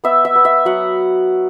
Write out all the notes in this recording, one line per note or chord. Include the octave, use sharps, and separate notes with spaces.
B3 E5
E5
B3
E5
F#3 F#5